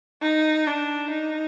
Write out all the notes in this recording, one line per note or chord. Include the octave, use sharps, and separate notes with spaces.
D#4
D4
D#4